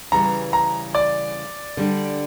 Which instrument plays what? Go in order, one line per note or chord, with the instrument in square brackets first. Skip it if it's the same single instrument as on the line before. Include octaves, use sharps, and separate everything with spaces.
[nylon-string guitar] C#3 E3 G3 [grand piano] A#5
[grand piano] A#5
D5
[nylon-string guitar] D3 G3 D4